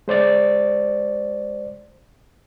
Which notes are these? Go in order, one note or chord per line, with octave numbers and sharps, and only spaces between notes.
G#3 C5 D5 A6